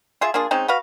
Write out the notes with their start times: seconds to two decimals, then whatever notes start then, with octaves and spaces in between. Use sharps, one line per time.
0.21 F4 G#4 E5
0.34 A#3 D4 F4 G#4
0.51 G#3 C4 C#4 D#4
0.68 F#4 B4 F5